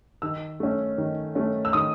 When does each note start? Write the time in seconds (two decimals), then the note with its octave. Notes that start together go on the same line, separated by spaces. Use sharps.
0.22 D#3 E6
0.60 A3 C#4
0.98 D#3
1.35 A3 C#4
1.65 E6
1.73 D#3 D#6